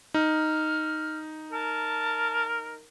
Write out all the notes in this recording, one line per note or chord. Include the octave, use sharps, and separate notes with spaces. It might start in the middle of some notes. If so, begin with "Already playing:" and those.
D#4 F6
A#4 A5